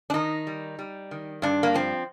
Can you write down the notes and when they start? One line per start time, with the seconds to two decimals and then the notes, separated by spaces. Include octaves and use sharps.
0.10 D4
0.14 D#3 D#4
0.47 G3
0.79 G3
1.11 D#3
1.42 G2 D4
1.63 A#3
1.74 F3 C4